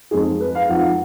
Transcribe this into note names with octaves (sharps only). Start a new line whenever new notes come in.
F2 F3 G#3 D#4 G#4
B4
F5
F2 F3 G#3 D#4 F#5